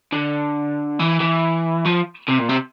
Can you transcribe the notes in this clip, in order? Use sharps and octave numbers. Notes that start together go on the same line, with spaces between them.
D3
E3
E3
F3
C3
A#2
C3